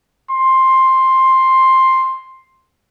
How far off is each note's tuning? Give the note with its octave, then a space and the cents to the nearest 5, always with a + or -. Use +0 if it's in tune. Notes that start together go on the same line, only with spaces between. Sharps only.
C6 +10